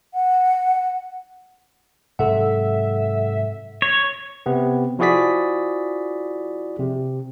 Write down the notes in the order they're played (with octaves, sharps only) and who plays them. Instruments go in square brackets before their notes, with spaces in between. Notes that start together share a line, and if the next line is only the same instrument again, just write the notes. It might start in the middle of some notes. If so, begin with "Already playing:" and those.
[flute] F#5
[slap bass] G#2 C3 F#3 [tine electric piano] A4 F#5 [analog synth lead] E5
[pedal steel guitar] C#5
[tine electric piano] C3 B3 C4
F3 E4 F#4 G#4 D5 B6
C3